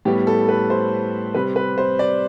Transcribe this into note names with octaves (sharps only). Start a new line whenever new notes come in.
A2 G3 B3 G4
A4
B4
C5
C3 G3 C4 B4
B4
C5
D5